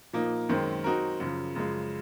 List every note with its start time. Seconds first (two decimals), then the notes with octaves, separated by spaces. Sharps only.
0.13 A#2 F3 A#3 D#4
0.49 F#2 D#3 G#3 C4
0.84 F#3 C4 D#4 F#4 A#4
1.20 F#2 C#3 F3
1.55 F#2 C#3 F3 G#3